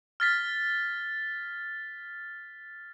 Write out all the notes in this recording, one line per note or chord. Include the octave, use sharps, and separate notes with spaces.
F6 A6 B6